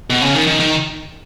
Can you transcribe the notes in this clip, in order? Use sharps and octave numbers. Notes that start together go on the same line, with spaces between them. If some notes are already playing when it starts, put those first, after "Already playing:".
B2
C#3
D#3
D#3
D#3